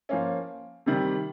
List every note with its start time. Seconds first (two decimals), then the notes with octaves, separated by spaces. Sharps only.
0.09 F3 A#3 C#4
0.86 C3 D#3 G3